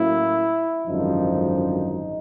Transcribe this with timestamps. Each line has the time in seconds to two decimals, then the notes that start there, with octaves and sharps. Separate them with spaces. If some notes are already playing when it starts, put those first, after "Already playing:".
Already playing: A2 F#3 A#3 C#4 E4
0.85 G#1 F#2 D3 F3 D#4